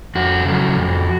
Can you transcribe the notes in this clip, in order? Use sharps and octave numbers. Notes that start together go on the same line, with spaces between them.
F2 F#4
C#3 F#3 A3
F2